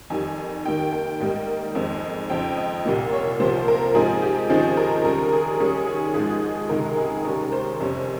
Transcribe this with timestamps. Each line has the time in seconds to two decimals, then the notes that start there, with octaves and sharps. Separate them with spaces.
0.10 F2 D#3 G3 G#5
0.65 D#2 D#3 A#3 G5
0.93 G5
1.20 G#2 G3 A#3 D#4
1.75 F2 D#3 G#3 C4
2.30 F2 C#3 F3 C4 G5
2.57 D#5
2.86 C2 A#2 G3 A#3
3.13 C#5
3.40 C2 C3 F3 A#3 C5
3.68 A#4
3.95 G#2 F3 C4 D#4 G#4
4.22 G4
4.50 D#2 C#3 F3 C4 D#4 G#4
4.77 A#4
5.04 D#2 C#3 G3 A#4
5.32 G#4
5.60 D#2 D#3 G3 C#4 G#4
5.87 G#4
6.14 G#2 F3 G#3 G#4
6.69 C#2 C3 D#3 G#3 A#4
6.97 G#4
7.25 D#2 C#3 G3 C#4 A#4
7.52 C5
7.80 F2 C3 G3 C#4